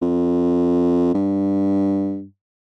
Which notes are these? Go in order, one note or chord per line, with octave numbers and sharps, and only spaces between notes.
F2
G2